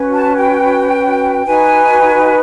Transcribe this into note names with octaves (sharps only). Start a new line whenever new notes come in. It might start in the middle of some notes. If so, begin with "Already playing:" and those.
Already playing: C#4 F#4 B4
A5
G5
D#4 F#4 B4 G#5